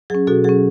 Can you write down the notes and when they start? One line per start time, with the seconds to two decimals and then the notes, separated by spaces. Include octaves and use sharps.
0.10 F#3 C#4 G#4
0.27 B2 F#4 A4
0.44 F#3 C#4 G#4